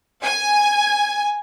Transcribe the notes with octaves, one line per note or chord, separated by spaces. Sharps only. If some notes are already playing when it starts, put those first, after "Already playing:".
G#5